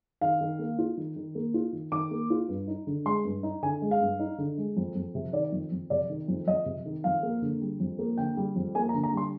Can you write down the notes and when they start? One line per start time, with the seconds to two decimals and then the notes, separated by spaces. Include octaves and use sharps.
0.21 D#3 F5
0.41 D#3
0.59 A#3
0.78 F4
0.97 D#3
1.16 D#3
1.35 A#3
1.54 F4
1.73 D#3
1.92 D#3 D6
2.11 A#3
2.30 F4
2.49 G2
2.68 D#4
2.87 D3
3.06 G#3 C6
3.25 G2
3.43 D#4
3.63 D3 G#5
3.82 G#3
3.91 F5
4.01 G2
4.19 D#4
4.38 D3
4.58 G#3
4.77 F2
4.96 F2
5.15 C3
5.33 D#3 D5
5.52 F2
5.72 F2
5.90 C3 D5
6.09 D#3
6.28 F2
6.47 F2 D#5
6.66 C3
6.85 D#3
7.04 F2 F5
7.23 A#3
7.42 D3
7.61 G3
7.80 F2
7.99 A#3
8.17 D3 G5
8.37 G3
8.56 F2
8.75 A#3 G#5
8.89 A#5
8.94 D3
9.04 A#5
9.13 G3 C6